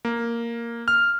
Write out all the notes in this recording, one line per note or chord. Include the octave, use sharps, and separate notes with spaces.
A#3
F6